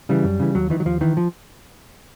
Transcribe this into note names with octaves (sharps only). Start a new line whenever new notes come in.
C#3 E3 G3
F#2
C#3 E3
D#2 F#3
D#3 E3
F#3
D#2 F3
D#3 E3
F3